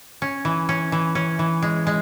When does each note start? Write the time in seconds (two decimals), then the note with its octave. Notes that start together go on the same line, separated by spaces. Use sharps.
0.22 C#4
0.45 E3
0.69 C#4
0.92 E3
1.15 C#4
1.39 E3
1.62 G#3
1.87 G#3